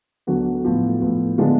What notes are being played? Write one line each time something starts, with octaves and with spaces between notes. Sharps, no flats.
D2 D3 F#3 B3 F#4
A2 F3 B3
A2 F3 B3
D3 G#3 B3 D4 F4